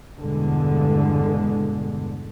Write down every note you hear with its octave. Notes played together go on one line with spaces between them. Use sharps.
E2 G2 B2 D3 G#3